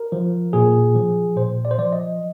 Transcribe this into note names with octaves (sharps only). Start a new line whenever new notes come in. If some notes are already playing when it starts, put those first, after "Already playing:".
Already playing: A#4
F3
A#2 G#4
F3
A#2 C5
D5
C5
F3 D5
D#5